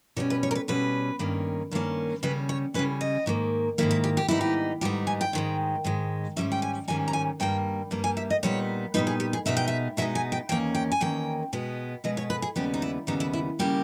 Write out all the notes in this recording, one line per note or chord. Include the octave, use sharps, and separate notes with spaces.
B2 G3 C#4 C#5
B4
C#5
A#4
B4
B2 G3 C#4 B4
G2 D#3 A#3 C#4
G2 D#3 A#3 C#4
C#3 G3 C#4 B4
C#5
C#3 G3 C#4 B4
D#5
G#2 D#3 A#3
G#2 D#3 A#3 E4
E4
G4
G4
G#2 G3 B3 D#4 E4
G4
G#2 G3 B3 D#4 G4
G#5
G5
G#2 D#3 G#3
G#2 D#3 G#3
G#2 D#3 G3 C#4 E5
G5
G#5
G#2 D#3 G3 C#4 G#5
A#5
G#5
G2 G3 A#3 G5
G2 G3 A#3
G#5
E5
D#5
A#2 G3 B3 D#4 C#5
A#2 G3 B3 D#4 B4
G#4
G4
G#4
B2 G#3 B3 D#4 E5
G5
E5
B2 G#3 B3 D#4 E5
G#5
G5
E2 D#3 A#3 C#4 G5
G5
G#5
E2 D#3 A#3 C#4 G5
B2 G#3 B3
B2 G#3 B3 D#5
C#5
B4
G#4
D#2 C#3 G3 B3 G4
D#4
E4
D#2 C#3 G3 B3 D#4
E4
E4
C#3 G3 A#3 G4